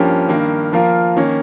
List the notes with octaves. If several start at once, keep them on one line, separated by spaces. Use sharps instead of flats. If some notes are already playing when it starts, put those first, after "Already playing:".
Already playing: G2 F3 A#3 C#4 G4
G2 D#3 A#3
F3 A#3 F4 A#4
D#3 A#3 C#4